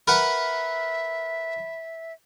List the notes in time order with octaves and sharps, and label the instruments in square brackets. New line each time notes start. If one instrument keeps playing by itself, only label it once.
[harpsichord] A#4 B4 F#5 [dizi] E5 [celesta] B5